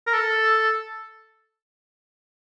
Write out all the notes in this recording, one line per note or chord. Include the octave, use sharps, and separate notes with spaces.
A#4
A4